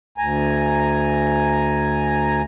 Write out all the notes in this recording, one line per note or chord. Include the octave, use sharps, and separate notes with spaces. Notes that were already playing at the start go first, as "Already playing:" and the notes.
D2 G#5 A#5